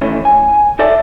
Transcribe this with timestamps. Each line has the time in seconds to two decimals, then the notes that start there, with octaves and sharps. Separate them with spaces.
0.01 D#3 E3 A3 C#4
0.25 G#5
0.79 D#4 A4 D5 E5 A5